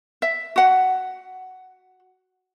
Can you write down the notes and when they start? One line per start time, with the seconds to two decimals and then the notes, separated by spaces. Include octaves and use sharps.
0.22 E5
0.56 F#4 F#5